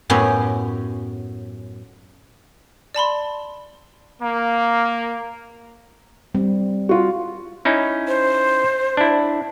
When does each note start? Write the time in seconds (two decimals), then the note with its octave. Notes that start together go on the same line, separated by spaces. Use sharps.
0.10 F#2 A2 B3 C#4 G4
2.95 D5 A5 B5 C6
4.21 A#3
6.35 G3 C4
6.89 F4 F#4
7.65 C#4 D#4 E4
8.08 C5
8.97 D4 E4